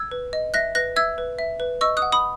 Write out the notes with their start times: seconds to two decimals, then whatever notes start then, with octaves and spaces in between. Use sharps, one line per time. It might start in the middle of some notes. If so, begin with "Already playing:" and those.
Already playing: E6 G#6
0.11 B4
0.33 D#5
0.54 E5 F#6 A#6
0.75 B4 F#6 A#6
0.96 E5 E6 G#6
1.18 B4
1.39 E5
1.60 B4
1.81 D#5 C#6 E6
1.97 D#6 F#6
2.02 F#5
2.12 B5 D#6